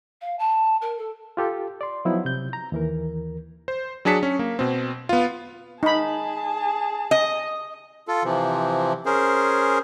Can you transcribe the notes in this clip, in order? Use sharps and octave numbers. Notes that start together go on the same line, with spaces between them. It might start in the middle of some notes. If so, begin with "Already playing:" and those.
F5
A5
A#4
A4
F4 G4 A4
D5 C6
F3 F#3 B3 D#4 E4
C3 G6
A#5
D#2 E3 A#4
C5
F#3 D4 G#4 A5 B6 C#7
C#4
A#3
B2 C4
B3 F4
D#4 G#4 A5 B5
D#5
F4 A4
C3 E3 F3
C#4 G#4 A#4 C5